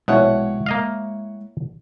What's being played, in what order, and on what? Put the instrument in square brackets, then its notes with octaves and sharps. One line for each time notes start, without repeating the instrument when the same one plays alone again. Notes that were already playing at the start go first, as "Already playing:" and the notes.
[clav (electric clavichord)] A#1 B2 [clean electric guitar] G#3 G5 [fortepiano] E4 C#5 F#5
[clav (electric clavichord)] A#3 D#5 F5